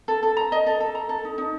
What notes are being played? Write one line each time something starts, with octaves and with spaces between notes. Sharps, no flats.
A4
A4
A#5
D#5
A4
A4
A#5
A4
D#4
D#4